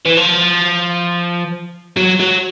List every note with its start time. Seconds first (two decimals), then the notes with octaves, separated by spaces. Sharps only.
0.05 E3
0.17 F3
1.97 F#3
2.20 F#3